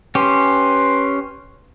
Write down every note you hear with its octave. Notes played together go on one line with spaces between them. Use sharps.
C#4 G4 B4 C6